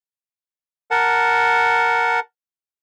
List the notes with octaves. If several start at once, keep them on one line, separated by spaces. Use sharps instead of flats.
A#4 F#5 A5